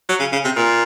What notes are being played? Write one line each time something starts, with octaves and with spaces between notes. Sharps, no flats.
F#3
C#3
C#3
C3
A#2